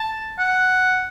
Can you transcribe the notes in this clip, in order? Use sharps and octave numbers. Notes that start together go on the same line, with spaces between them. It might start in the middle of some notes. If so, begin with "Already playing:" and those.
Already playing: A5
F#5